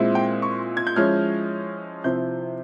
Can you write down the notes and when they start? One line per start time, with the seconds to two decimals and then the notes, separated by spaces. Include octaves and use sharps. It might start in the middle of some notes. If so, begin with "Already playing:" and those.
Already playing: A#2 G#3 C4 E4
0.15 G5
0.42 C#6
0.77 G#6
0.87 G6
0.96 F3 G#3 C#4 E4 F6
2.04 C3 F3 C4 E4 G6